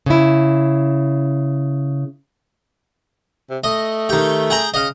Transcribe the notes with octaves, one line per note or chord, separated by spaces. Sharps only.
C#3 E4
C3
A3 D#5
D#3 G4
G#4 G5 A#5
C#3 D#5 F5